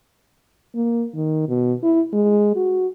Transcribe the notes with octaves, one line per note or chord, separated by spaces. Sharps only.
A#3
D#3
B2
E4
G#3
F#4